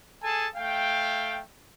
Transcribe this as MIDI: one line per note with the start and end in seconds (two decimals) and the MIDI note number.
0.23 0.48 68
0.23 0.48 69
0.23 0.48 80
0.23 0.48 81
0.55 1.40 57
0.55 1.40 77
0.55 1.40 79